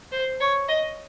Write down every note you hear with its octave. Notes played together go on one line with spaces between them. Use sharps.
C5
C#5
D#5